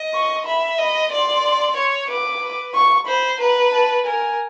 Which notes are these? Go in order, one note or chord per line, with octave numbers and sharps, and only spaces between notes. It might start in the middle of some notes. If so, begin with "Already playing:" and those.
Already playing: D#5
C#6
E5 B5
D#5 B5
D5 C6
C#5
B4 D6
B4
C#6
C5 B5
B4 A#5
A5
A#4 G#5